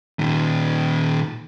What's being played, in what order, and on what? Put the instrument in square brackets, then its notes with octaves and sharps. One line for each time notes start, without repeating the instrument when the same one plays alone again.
[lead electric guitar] A#2 D#3